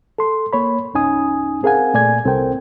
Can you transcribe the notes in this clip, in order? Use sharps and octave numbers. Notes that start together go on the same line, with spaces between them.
A4 C6
A#3 C#5 B5
C2 F#2 C#4 D#4 G#5 D#6
C4 G#4 A#4 F5 F#5 G#5
A#2 A3 D5 G#5 G#6
C2 C4 A4 A#4 C5 G5